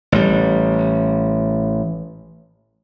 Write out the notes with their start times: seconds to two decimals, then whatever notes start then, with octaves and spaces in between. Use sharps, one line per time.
0.12 A1 G3